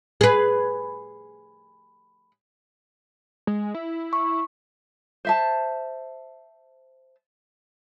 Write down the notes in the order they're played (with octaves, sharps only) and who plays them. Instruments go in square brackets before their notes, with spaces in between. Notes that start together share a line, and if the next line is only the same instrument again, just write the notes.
[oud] G#4 B4
[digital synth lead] G#3
E4
[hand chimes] C#6
[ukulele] C5 E5 A5